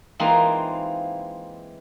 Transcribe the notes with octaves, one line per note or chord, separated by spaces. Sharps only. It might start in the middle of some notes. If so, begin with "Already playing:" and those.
E3 G#3 A#3 C4 D#4 F4